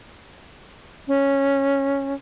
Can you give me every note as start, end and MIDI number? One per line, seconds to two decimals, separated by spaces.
1.08 2.14 61